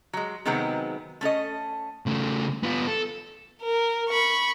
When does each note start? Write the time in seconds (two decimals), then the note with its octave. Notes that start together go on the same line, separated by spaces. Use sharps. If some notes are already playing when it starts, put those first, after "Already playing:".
0.13 F#3 G#3
0.45 C3 D#3 F#3 G#3 B3 C4
1.21 A3 C#4 A4 D#5
2.06 C#3 A3
2.63 B3 F4
2.87 A4
3.62 A#4
4.09 B5 C#6